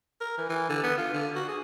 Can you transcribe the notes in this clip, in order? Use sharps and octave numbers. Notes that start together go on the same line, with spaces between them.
A#4
E3
E3
D3
B3
F4
D3
F#4
G#4